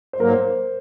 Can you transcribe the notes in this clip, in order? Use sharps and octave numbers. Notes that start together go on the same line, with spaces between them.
C5
G#2 F#3 A#3 A#4
C5